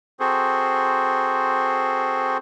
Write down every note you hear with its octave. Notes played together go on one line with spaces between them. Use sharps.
C4 F#4 G#4 A4 C5